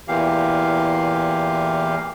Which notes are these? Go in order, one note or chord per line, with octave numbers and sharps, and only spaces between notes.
E2 A#2 E3 G4 F5